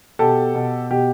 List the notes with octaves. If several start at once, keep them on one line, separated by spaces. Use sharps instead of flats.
B2 G4 A4
B2
B2 G4